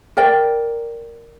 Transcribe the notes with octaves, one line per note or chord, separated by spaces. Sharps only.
A#4 D5 G5